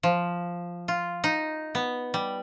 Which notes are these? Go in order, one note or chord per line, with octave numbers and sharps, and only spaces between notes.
F3
F4
D#4
B3
G3